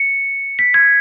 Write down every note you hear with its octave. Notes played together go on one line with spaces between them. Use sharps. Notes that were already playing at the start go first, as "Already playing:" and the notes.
Already playing: C#7
B6
G#6